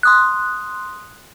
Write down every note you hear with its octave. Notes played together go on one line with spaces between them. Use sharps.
C6 D#6 F#6